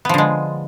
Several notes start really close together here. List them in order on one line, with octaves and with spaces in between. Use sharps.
B3 F3 D3 G#3